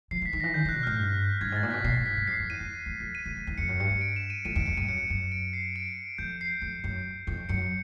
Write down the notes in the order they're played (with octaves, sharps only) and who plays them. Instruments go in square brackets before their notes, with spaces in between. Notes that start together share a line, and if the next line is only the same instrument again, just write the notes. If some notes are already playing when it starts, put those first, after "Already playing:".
[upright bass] F3 [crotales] C7
[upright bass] E3
[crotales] B6
[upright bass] D#3
[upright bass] E3 [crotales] A#6
[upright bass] D3 [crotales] G6
[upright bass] D3 [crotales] F#6
[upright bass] B2
[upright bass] A2 [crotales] F6
[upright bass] G2
[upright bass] G2 [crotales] G#6
[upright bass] G#2 [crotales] A6
[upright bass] A#2
[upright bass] B2 [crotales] B6
[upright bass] A#2 [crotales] C7
[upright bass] G#2
[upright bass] G2 [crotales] B6
[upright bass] G2
[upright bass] F#2 [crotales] C7
[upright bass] F2
[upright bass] E2 [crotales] D#7
[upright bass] E2
E2
F2
[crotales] D#7
[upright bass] F2
E2
E2
[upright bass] F2 [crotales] C#7
[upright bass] F#2
[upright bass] G2 [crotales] C#7
[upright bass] G2
[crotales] D7
E7
D#7
[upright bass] F2 [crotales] D#7
[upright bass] E2 [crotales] D7
[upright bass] F2 [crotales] C#7
[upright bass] G2 [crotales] D#7
[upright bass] F#2 [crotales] C#7
[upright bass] F#2
[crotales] D7
C7
D7
[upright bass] F2 [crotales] G6
[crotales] C7
[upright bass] F2
F#2
F2
[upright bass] F#2 [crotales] C#7